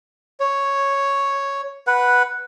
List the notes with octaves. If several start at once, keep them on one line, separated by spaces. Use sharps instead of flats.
C#5
B4 F#5